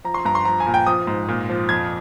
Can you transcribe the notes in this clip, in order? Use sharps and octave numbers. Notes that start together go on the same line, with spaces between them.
F3 A#5
C6
G2 A#5
C6
F3 A#5
G#5
A#2
G5
F3 D#6
G#2
A#2
F3
F2 G#6